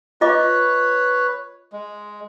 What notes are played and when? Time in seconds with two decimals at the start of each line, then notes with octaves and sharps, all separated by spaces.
0.21 F4 B4 C#5 D#5 D6
1.72 G#3